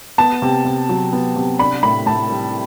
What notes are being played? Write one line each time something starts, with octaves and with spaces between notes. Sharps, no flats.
B3 A5
C3
C3
F#3
B3
C3
D4 B5
A2 B5
A2 A5
G3